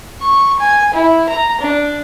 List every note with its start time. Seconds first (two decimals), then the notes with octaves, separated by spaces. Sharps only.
0.21 C#6
0.60 G#5
0.94 E4
1.29 A#5
1.61 D4